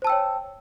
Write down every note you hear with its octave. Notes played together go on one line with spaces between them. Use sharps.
C5 C#5 G5 A5 E6